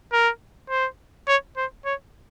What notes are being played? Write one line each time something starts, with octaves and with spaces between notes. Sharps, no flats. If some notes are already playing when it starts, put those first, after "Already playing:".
A#4
C5
C#5
C5
C#5